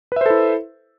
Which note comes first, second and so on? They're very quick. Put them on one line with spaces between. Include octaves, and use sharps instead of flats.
B4 E5 C5 A4 E4